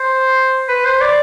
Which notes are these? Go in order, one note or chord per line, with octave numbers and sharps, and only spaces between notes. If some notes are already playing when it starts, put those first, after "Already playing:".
Already playing: C5
B4
C5
D5